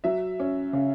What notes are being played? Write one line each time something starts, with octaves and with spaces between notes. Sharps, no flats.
F#3 E5
C#4
C#3